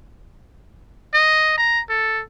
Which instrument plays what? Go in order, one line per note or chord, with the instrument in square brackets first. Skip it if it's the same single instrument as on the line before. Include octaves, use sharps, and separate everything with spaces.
[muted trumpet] D#5
A#5
A4